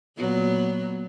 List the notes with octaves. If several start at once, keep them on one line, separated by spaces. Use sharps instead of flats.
A#2 F#3 B3